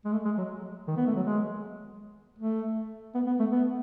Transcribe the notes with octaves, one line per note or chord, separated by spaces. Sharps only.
G#3
A3
G#3
F#3
D#3
B3
A3
F#3
G#3
A3
B3
B3
A3
B3